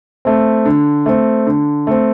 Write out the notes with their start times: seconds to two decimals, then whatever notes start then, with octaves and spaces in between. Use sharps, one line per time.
0.25 A3 C4
0.65 D3
1.06 A3 C4
1.47 D3
1.87 A3 C4